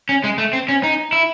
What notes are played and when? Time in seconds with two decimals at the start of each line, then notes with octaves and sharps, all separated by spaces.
0.09 C#4
0.24 G#3
0.38 A3
0.53 C4
0.69 C#4
0.83 D#4
1.13 E4